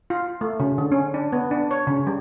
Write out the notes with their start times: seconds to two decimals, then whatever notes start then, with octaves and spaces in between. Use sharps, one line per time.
0.10 F4
0.41 A3
0.60 C#3
0.78 D3
0.92 C#4
1.14 D4
1.32 B3
1.51 D4
1.71 C#5
1.87 C#3
2.07 G3